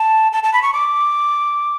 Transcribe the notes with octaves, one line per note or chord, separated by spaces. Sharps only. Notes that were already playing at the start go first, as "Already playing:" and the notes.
Already playing: A5
A5
A5
B5
C#6
D6